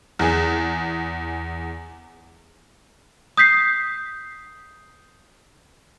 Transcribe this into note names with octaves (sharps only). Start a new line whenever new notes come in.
E2 G#4
D#6 G6 B6 C7